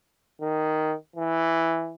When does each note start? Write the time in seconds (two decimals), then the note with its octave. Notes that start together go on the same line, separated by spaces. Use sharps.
0.41 D#3
1.16 E3